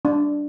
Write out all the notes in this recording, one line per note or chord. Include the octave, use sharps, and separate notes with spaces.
D4